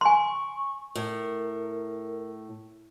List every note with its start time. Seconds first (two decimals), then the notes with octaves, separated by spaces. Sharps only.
0.01 G#5 C6 C#6
0.96 A2 A#4